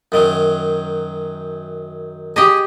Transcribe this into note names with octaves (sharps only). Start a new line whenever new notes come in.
F#2 D#3 F#3
G4 G#4 D#5